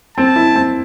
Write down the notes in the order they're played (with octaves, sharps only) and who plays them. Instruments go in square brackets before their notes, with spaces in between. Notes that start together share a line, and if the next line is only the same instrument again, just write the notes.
[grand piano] C4 [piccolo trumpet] A5
[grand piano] E4
C4